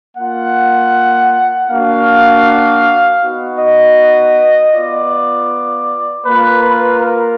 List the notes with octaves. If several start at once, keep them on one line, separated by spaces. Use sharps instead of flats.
A#3 F4 F#5
A#3 D4 F#4 F5
B3 D#4 F#4
D#5
B3 F4 D5
A#3 F4 B4
B4
A#4